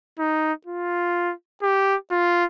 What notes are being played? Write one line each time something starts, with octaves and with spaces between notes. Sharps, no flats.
D#4
F4
G4
F4